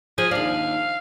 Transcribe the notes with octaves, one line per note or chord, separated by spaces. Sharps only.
F3 G#4
D#2 D4 F5